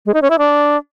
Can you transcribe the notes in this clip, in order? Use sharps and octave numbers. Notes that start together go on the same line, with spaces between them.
G#3
D#4
C#4
E4
D4